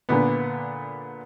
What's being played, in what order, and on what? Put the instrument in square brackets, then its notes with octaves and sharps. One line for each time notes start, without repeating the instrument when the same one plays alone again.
[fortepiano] A#2 D3 B3